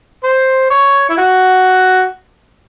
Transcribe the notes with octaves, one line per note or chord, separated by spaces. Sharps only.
C5
C#5
E4
F#4